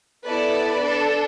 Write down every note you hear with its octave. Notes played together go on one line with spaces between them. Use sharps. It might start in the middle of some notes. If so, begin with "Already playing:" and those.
B3 E4 A4 B4 D5
D4 A4